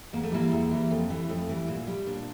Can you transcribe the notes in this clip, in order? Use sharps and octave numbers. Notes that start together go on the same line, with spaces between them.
E2 A#3
A3
E3 G3 A#3
E2
E3 G3
F2
E3 G3
F2 A3
E3 G3
A#2
G3
A#2 D4